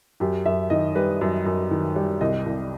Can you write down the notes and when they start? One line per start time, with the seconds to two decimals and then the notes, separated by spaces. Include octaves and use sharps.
0.20 F#2 G4
0.46 F#2 E5
0.70 D#3 D#5
0.95 G3 B4
1.21 F#2
1.46 F#2
1.71 D#3
1.96 G3
2.21 C2 D#5
2.46 C2